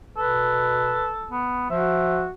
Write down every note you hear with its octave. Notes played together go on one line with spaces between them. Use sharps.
B2 A4 B4
B3
F3 F#4 E5